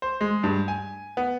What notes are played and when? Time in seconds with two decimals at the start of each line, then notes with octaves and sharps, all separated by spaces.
0.02 C5
0.21 G#3
0.44 G2
0.68 G#5
1.17 B3